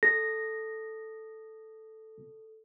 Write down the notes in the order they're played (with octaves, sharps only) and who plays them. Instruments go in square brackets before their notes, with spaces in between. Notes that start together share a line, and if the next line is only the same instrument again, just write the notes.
[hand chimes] A4 [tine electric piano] A#6